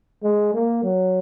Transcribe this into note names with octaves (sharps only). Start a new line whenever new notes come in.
G#3
A#3
F#3